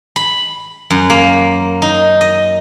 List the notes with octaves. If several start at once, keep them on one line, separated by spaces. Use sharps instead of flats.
B5
F#2
A#3
D#4
D#5